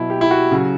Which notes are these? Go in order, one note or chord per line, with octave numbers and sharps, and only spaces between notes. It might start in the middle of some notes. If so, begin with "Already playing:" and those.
Already playing: B2 F#3 E4
G4
E4
F#4
C#3 F#3